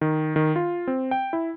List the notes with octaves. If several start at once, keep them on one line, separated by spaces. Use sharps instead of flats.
D#3
D#3
F4
C4
G5
E4